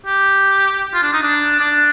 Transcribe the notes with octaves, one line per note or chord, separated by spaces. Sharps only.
G4
F4
D4
D#4
D4
D4